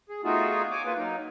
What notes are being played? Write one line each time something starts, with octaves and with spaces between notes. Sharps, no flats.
G#4
A3 B3 D#4 F4 F#4 G#4
C#5 G#5 D6
A#3 F4 B4
F#3 A#3 D#4